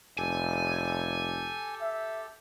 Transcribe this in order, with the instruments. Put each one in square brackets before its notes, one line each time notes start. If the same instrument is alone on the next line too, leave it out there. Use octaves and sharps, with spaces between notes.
[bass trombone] F1 [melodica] G4 A4 [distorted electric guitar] G#5
[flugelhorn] E5